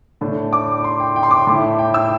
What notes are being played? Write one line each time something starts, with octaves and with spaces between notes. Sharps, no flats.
A2 A3 D4
D6
C6
G5
G5
C6
D6
A2 A3 E4
G5
E6